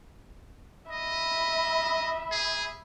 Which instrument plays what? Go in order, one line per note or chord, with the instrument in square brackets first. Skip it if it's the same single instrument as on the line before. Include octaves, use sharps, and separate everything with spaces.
[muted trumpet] D#5 [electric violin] E5 B5
[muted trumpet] G#4